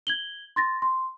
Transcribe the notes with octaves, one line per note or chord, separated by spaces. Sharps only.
G#6 F#7 G7
C6 A6 A#6
C6